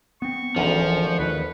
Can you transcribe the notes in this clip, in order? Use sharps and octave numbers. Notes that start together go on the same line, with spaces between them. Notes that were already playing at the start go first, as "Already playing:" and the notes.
B3 C4 C#6
D1 G#1 D2 E3 F3 C#4
D#2 D#3 B4